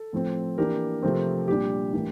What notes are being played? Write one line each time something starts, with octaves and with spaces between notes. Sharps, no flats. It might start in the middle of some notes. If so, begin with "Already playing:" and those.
Already playing: A4
A2 F3 C4
E3 A#3 D4 G4 A#4
C3 F3 A3 C4
A#2 G3 D4 G4
A2 E3 A#3 D4